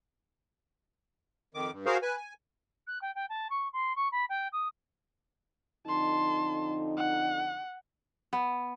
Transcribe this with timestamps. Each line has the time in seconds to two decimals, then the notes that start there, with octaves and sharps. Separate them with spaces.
1.54 F2 D#3 D6
1.72 G2
1.86 F#4 G#4 A#4 C5 F5
2.02 B4 G#5
2.17 G#5
2.87 F#6
3.01 G5
3.15 G5
3.29 A5
3.50 C#6
3.73 C6
3.96 C#6
4.11 B5
4.29 G5
4.52 D#6
5.87 F2 D3 D#4 A5 C6
6.97 F#5
8.33 B3